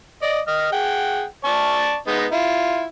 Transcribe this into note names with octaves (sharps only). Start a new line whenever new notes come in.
D5 D#5
D#5 F6
G#4 F#5 G5
D5 A5 C#6
G#3 B3 D#4
E4 F4